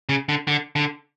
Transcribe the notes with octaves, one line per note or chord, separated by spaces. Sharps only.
C#3
D3
D3
D3